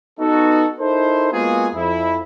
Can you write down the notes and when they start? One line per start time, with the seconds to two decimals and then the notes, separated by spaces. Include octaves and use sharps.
0.19 B3 D#4 F#4 A4
0.80 D#4 E4 A4 A#4 C5
1.32 G#3 A#3 B3 F4 F#4 G#4
1.75 F2 E4